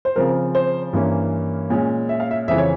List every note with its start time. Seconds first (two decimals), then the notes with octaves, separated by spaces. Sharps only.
0.05 C5
0.16 C#3 F3 C4 A#4
0.55 C5
0.93 G2 E3 A#3 C#4
1.70 A#2 G#3 C#4
2.09 E5
2.20 F5
2.31 E5
2.48 F2 C#3 E3 E5
2.58 C#5